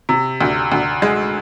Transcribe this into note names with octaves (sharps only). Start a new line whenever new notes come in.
C3
D2
D2
G#3